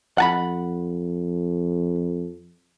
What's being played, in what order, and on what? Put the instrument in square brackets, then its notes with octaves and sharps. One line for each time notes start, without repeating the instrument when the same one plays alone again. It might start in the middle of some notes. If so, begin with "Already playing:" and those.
[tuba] F2 [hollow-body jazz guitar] F#5 A5 B5